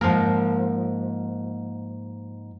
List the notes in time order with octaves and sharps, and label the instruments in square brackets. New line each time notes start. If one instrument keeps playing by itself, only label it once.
[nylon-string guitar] G#2 A#3 [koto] F3 A#4